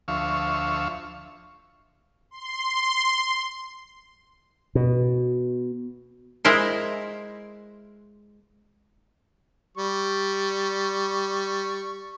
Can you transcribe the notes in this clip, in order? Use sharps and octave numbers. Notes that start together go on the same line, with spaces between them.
D2 F3 E5 F5 C#6
C6
B2
G#3 E4 A#4 C5
G3 C#6